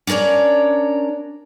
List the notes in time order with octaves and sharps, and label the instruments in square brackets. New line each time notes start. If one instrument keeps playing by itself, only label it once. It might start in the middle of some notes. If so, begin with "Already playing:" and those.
[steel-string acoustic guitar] C#4 D4 A#4 C#5 D5